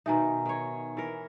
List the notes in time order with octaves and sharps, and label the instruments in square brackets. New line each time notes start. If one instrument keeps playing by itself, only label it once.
[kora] B2 D#3 D#4 [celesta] E5 G#5 A#5
[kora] D#3 C#5
E3 A#4